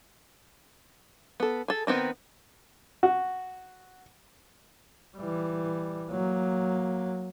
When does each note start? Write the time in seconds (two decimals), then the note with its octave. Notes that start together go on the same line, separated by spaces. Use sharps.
1.40 B3 A4
1.68 G#4 A4
1.87 D#3 B3 C4 D#4
3.03 F#4
5.16 E3 G3
6.10 F#3 A#3